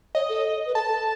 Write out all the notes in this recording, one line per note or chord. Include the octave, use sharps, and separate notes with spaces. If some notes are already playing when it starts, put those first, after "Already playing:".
C#5 D#5
A4
B4
A4 A5
A4